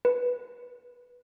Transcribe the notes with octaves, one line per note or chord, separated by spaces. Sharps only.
B4